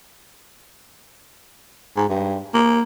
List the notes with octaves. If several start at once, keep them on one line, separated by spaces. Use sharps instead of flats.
G#2
G2
A#3